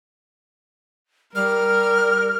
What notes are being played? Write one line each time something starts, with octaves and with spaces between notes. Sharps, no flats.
G3 A#4 F6